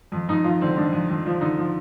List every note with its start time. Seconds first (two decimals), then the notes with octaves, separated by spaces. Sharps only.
0.12 F2
0.28 F2 D#4
0.44 F2 F4
0.61 D3 C4
0.77 F2 D4
0.92 F2
1.09 F2
1.26 F3
1.41 D3 D#4
1.57 F3